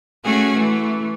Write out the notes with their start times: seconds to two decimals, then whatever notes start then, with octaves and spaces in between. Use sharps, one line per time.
0.22 A3 C#4 F#4 G#4 G#5
0.56 E3 A3